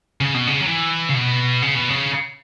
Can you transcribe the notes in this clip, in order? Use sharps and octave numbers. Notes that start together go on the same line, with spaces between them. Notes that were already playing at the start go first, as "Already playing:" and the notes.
C#3
B2
C#3
F#3
E3
C#3
B2
C#3
B2
C#3